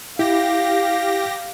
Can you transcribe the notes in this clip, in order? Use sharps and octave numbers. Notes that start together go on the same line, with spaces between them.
E4 G4 F5 A#6